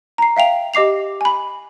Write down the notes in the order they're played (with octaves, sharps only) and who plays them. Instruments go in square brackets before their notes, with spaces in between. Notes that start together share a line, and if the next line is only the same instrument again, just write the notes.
[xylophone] A#5 C7
E5 F5 G5 F7
G4 D#5 D6 C7 F7
G#5 B5